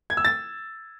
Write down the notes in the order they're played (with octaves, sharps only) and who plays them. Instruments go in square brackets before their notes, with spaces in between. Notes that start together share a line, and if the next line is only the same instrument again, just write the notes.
[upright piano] G#6
E6
A6